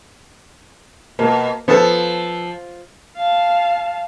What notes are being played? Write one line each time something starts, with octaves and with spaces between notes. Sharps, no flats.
B2 A#3
F3 B3 A4 A5
F5 A5